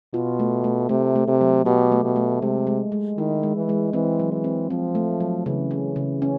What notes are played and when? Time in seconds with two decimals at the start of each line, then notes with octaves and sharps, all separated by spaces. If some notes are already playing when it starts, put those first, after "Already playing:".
0.14 B2 F4
0.40 A3
0.64 A3
0.89 C3 A3
1.16 A3
1.28 C3
1.41 F#3
1.66 B2 G4
1.92 A3
2.04 B2
2.16 A3
2.42 C3 G#3
2.67 G#3
2.92 G#3
3.18 D#3 E4
3.43 G#3
3.56 E3
3.69 G#3
3.93 E3 C4
4.20 F#3
4.32 E3
4.44 C4
4.70 F3 C4
4.95 A3
5.20 F#3
5.46 C#3 E3
5.71 C#4
5.96 C#3
6.22 C#4